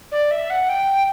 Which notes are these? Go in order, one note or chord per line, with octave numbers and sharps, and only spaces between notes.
D5
E5
F#5
G5